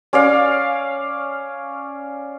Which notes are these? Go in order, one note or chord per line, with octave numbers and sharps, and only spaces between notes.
C#4 D5 F5